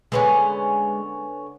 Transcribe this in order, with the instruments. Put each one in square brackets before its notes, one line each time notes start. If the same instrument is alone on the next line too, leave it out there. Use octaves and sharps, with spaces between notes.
[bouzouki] D3 B3 C#4 [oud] G#3 B4 C#5